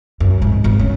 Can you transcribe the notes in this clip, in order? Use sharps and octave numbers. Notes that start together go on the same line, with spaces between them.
F#2
G#2
G#1
C#4